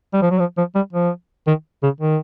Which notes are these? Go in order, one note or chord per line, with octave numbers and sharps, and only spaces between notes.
G3
F3
F#3
F3
F3
G3
F3
D#3
C#3
D#3